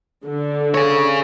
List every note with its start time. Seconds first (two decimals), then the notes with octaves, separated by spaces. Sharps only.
0.25 D3
0.74 G#4 C#5